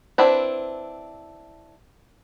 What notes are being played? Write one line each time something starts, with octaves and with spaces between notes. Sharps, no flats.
C4 D4 E4 B4